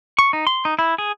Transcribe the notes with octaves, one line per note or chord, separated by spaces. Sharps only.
C#6
D#4
C6
D#4
E4
G#4